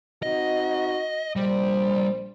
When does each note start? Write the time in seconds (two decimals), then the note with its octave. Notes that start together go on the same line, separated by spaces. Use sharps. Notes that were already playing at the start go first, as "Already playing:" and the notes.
0.23 C4 D#4 F#4 D#5
1.36 A#1 G3 D4 C5